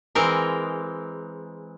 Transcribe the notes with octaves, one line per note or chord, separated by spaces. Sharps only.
E3 G#3 C4 A#4